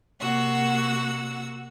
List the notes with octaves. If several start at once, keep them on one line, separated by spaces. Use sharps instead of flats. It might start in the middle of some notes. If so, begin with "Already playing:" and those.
C3 A#3 F#4 F#5 E6